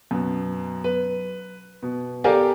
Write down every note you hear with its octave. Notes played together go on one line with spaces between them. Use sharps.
F#2 B2
B4
B2
G4 A4 A#4 D5 F5 G#5